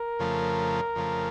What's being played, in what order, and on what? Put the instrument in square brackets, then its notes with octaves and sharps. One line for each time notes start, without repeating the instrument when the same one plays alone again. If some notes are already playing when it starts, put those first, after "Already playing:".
Already playing: [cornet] A#4
[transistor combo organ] F2 C#3 F3 A3
F2 C#3 F3 A3